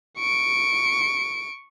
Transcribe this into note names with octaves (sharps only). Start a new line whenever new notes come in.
C#6 D7